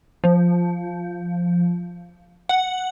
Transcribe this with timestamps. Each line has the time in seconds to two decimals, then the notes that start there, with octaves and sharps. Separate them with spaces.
0.24 F3
2.49 F#5